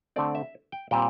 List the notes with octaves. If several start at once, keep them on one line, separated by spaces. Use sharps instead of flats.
D3 A3 C4 D5
E5
G5
A#2 G3 C4 G5